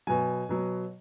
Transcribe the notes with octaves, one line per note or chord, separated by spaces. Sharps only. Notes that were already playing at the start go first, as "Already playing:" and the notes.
B2 F#3 G#5
B2 F#3